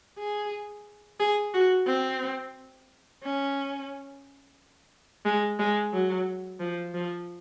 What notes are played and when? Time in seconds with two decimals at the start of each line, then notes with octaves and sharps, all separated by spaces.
0.19 G#4
1.20 G#4
1.54 F#4
1.87 C4
3.22 C#4
5.25 G#3
5.59 G#3
5.93 F#3
6.60 F3
6.94 F3